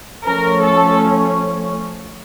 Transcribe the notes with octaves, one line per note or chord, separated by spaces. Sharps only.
F3 A3 C#4 A#4
A4